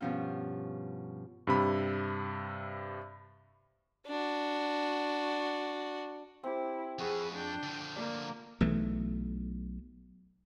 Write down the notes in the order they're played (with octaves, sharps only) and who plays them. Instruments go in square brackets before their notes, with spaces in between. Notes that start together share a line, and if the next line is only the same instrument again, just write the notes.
[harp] G2 B2 F3 C#4 F4
[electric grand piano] G2 C3 B5
[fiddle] D4 F#4
[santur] C4 G4 [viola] E4
[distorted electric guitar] F2 [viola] G#4 B4 [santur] F#5 C#6
[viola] D4 G5
[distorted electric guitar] D3 F3
[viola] A#3 [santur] D4 A#5
[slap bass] B1 E3 A3